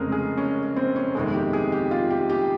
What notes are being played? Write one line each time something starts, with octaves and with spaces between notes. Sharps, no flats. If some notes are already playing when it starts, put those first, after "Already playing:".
Already playing: F1 F2 C#3 G#3 G#4 A#4
G#4
C#4
C4
C#4
G1 F2 C3 D#3 G#3
G4
G#4
G4
F4
G4
G4